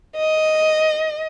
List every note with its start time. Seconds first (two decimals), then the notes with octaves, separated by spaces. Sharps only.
0.16 D#5